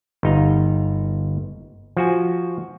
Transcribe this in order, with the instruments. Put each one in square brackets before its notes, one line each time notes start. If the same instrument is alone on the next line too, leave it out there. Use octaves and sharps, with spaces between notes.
[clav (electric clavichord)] G1 D#4 F5
F3 F#4 G#5